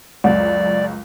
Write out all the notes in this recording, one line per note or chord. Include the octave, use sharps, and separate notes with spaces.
C#2 F#2 D5